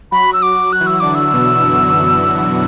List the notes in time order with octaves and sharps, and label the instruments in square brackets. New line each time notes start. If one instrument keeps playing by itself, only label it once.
[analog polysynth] F#3 F#4 [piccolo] B5
[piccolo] E6
D6
[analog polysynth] F#3 F#4
[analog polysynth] F#4 [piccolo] F#6
[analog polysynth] E3 E4
[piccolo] E6
[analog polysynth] D3 D4 [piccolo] D6
[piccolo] E6
[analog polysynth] B2 B3
F#2 F#3